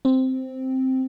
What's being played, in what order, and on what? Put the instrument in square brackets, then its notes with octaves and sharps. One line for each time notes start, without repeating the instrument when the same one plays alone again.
[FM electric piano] C4